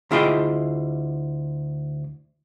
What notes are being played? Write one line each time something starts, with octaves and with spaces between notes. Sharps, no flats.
D2 E4 F4 G#4 D#5 G5